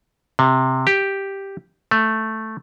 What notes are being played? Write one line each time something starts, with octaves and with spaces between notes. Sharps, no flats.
C3
G4
A3